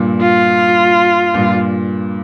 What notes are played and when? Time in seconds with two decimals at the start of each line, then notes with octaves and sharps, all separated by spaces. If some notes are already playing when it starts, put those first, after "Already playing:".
Already playing: G2 A#2
0.21 F4
1.34 G2 A#2